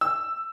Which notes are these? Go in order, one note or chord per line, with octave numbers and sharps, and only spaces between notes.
E6